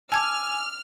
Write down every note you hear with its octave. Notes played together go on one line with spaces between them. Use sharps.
G#5 A5 D6 E6 F6 G#6